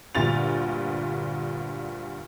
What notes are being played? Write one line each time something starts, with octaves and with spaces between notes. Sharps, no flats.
D2 G2 A#2 A6 F7